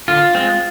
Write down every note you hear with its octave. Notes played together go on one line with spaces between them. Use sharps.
D3 F4
G#3 C4